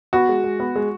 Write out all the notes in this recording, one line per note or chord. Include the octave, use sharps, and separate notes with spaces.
B3 F#4
G#3
G#3
B3
G#3